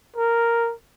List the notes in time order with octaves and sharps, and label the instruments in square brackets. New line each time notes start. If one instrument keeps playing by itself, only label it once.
[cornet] A#4